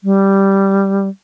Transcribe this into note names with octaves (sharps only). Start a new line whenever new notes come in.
G3